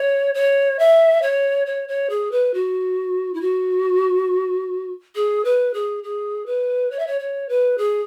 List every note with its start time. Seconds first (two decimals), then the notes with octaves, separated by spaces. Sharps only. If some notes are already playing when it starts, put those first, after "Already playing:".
Already playing: C#5
0.34 C#5
0.79 E5
1.22 C#5
1.66 C#5
1.88 C#5
2.10 G#4
2.31 B4
2.54 F#4
3.34 E4
3.41 F#4
5.15 G#4
5.44 B4
5.74 G#4
6.04 G#4
6.46 B4
6.91 C#5
6.99 E5
7.07 C#5
7.20 C#5
7.49 B4
7.78 G#4